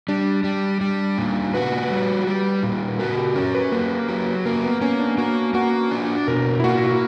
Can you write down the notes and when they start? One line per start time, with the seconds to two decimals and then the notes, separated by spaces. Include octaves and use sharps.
0.08 G3 D4
0.44 G3
0.81 G3
1.18 A#2
1.54 F#4 B4
1.90 G3
2.27 G3
2.63 A#2
2.99 F#4 A#4
3.18 G4
3.36 C#4 A#4
3.55 B4
3.72 A#3 B4
4.09 F#3
4.46 A#3 A#4
4.64 B3
4.81 A#3 C#4
4.99 D4
5.18 A#3 F#4
5.54 A#3 F#4
5.91 D4
6.27 B2 A#4
6.60 E4
6.64 A#3 F#4